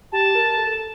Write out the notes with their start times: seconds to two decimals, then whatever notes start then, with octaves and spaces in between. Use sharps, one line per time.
0.12 G4 A5
0.35 A#4
0.58 A4